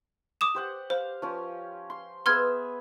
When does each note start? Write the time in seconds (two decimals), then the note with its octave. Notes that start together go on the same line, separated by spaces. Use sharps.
0.41 D6 D#6 E7
0.55 G4 C5 F#5
0.90 C5 F5
1.22 F3 C#4
1.90 C6
2.26 B3 G#4 E5 C6 F6 G#6